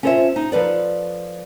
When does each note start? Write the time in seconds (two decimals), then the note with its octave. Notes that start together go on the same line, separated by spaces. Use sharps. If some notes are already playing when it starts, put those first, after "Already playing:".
0.03 C#4 F4 A4 C5 C#5 E5
0.36 D#4
0.52 F3 A4 B4 D5